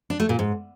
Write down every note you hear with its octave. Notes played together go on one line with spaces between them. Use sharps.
D4
A3
A#2
G#2